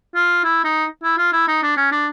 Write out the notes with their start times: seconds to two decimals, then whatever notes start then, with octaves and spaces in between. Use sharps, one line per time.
0.15 F4
0.44 E4
0.64 D#4
1.03 E4
1.18 F4
1.33 E4
1.48 D#4
1.63 D4
1.77 C#4
1.92 D4